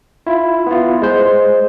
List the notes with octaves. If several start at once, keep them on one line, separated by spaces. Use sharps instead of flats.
E4 F4
B3 E4 F4
G#3 C5